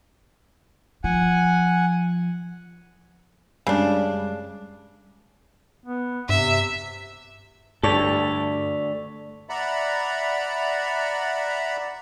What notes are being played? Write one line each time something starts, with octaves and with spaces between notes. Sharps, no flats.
F3 F#5 G#5
F#2 C#3 G3 G#3 D4
B3
G2 C3 E5
D2 G2 A4 D5 C#6 B6 F7
D5 E5 F#5 A#5 B5